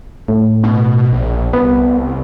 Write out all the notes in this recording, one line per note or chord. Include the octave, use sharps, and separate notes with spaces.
A2
B2
A#1
C2 B3